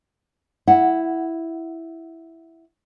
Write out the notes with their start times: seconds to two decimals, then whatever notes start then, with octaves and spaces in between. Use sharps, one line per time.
0.67 E4 F#5